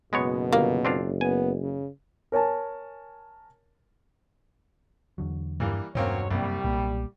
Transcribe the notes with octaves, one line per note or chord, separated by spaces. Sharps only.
F#1 B2 G#3 B3 C#5
G1 A#3
C4 D4 F4
B3 G#5
C#3
A#4 C#5 G#5 A5
E2 D3 F#3
G2 E3 G3 A#3
E1 B1 G2 F#3 A#3 C4 C#4 C#5
C2 F#2 G3 A#3
B1 A#2 A#3